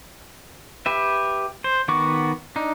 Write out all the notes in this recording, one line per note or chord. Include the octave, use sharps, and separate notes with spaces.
G4 B4 E5
C5
D#3 B3 F#4 C#6 D6
D4 D#4